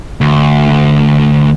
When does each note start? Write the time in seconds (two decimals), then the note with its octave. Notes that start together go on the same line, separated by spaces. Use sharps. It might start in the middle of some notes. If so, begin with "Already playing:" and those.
0.21 D2